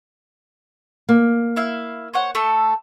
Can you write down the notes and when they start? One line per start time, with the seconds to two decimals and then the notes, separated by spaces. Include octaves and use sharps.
1.09 A#3
1.56 E4 E5 F5
2.14 C5 C#5 F#5
2.35 A3 A4